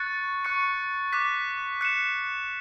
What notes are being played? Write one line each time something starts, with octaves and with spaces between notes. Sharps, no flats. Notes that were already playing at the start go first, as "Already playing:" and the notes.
Already playing: C#6 F#6 A6 C#7
C#6 F#6 C#7
D6 F#6 B6
F#6 C#7 E7